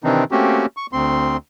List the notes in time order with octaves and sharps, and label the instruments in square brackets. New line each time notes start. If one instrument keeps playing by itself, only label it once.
[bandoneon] C3 D#3 E3 C4 D4 D#4
A3 A#3 C4 C#4 F#4 G4
C#6
D2 C4 C6